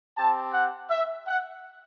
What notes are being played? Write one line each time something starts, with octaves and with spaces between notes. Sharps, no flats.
C4 G4 A5
F#5
E5
F#5